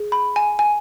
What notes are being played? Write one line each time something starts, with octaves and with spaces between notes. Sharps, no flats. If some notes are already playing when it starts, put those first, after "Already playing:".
Already playing: G#4
B5
G#5
G#5